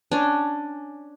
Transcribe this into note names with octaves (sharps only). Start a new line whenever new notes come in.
C#4 D4